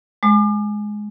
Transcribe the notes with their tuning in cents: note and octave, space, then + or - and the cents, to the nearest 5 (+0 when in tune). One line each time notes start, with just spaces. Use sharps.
G#3 +10 D6 +40